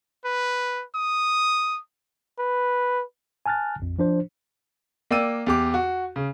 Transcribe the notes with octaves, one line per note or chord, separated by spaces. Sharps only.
B4
D#6
B4
G#5 A5 F6 F#6 A6
A#1 F2
F3 D4 C5
A#3 D5 G5 E6 D#7
E2 G4 D6
F#4
C#3